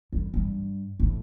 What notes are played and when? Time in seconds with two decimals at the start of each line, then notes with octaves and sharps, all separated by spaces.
0.12 G2
0.34 G2
1.00 A2